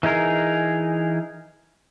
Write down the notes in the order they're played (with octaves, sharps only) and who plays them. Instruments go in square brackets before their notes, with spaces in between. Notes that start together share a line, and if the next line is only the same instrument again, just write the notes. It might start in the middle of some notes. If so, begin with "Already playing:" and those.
[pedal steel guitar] E3 D#4 G#4 A#4